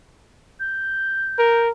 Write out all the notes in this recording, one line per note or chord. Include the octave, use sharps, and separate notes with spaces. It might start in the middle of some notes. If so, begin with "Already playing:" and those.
G6
A#4